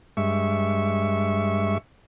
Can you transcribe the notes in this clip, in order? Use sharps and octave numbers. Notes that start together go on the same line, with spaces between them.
G2 G#3 E5 C#6